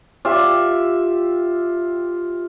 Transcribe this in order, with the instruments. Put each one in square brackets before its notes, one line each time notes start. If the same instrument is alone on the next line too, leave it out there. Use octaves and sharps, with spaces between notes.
[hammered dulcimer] F4 G4 E5